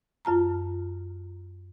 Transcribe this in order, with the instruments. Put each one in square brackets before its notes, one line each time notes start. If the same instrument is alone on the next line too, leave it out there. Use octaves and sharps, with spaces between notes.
[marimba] F#2 F4 A5 A#5